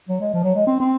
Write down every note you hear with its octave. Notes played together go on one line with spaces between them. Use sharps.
F#3
G#3
F3
F#3
G#3
C4
C4